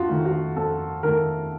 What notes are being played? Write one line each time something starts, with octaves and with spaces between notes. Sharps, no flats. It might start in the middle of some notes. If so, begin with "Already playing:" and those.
Already playing: F2 F4 F#4
D#3 A3
F#4
F2 A4
D#3 A3 A#4